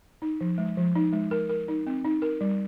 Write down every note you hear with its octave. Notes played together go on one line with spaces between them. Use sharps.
D#4
F3
G#3
F3
D#4
G#3
A#4
A#4
D#4
C4
D#4
A#4
G3